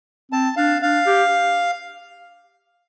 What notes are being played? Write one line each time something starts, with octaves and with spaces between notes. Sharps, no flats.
C4 A5
D4 F5
D4 F5
G4